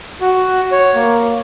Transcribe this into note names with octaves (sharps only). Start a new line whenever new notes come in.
F#4
C#5
A#3